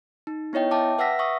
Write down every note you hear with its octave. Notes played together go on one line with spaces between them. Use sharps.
D#4
B3 E4 C#5 D#5 G5
E5 G5 A5 D6
B4 E5 F#5 E6 A#6 B6
E5 C#6 D#6